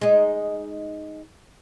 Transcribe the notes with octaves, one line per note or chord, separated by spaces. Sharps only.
G#3 D#4